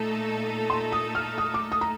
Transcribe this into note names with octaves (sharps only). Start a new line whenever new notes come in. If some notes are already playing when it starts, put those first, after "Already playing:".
Already playing: A#2 A3 D#4 A4
C6
D#6
F6
D#6
D6
D#6
A#5